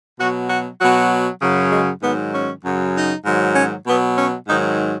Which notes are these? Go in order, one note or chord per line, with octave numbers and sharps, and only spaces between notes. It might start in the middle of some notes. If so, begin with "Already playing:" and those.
B2 F#3 F#4
F#4
B2 F#3 F#4
F#2 C#3 F#3
G#3
G#2 D#3 F#3 B3
C#4
F#2 C#3 F#3
D#4
G#2 D#3 F#3
C#4
B2 F#3 B3
C#4
G#2 D#3 F#3 D#4